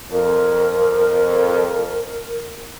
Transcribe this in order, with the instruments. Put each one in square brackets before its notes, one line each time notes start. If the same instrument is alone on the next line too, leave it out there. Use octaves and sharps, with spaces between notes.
[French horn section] F2 [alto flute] A#4